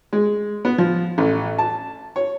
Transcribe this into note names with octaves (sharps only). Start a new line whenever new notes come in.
G#3
B3
F3
A1
A5
C#5